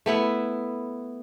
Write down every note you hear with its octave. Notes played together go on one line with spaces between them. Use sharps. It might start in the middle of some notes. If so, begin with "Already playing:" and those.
A3 B3 E4